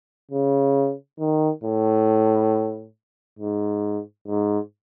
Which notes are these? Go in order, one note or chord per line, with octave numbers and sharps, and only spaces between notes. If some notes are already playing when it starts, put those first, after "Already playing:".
C#3
D#3
A2
G#2
G#2